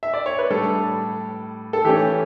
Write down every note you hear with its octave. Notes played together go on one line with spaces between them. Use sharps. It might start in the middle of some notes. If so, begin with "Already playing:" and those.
E5
D5
C#5
B4
A2 G3 D4 A4
A4
E3 A3 C#4 G4